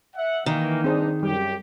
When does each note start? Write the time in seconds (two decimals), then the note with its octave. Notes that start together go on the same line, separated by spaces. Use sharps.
0.16 E5 F#5
0.46 D#3 E3 A#3
0.84 G2 C4 D4 D#4 G#4 C5
1.23 F#2 G3 G4